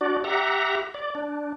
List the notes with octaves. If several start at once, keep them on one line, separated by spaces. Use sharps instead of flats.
D4 F#4 D5
G4 E5 F#5 A#5
D5
D4